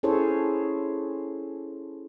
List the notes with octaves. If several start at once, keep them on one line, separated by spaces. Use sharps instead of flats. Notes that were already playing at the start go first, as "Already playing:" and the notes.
C#4 E4 G#4 A4 C5 C#5